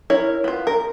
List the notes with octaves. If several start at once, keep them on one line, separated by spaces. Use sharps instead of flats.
E4 A#4 C#5
B3 F4
A#4